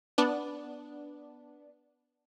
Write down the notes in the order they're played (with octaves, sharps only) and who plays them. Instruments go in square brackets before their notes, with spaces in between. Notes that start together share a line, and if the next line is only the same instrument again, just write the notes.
[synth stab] B3 D4